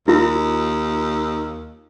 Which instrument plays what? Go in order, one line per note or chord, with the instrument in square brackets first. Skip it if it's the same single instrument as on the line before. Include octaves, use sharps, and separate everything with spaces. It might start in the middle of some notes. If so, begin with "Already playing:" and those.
[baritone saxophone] D#2 [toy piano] E4 F4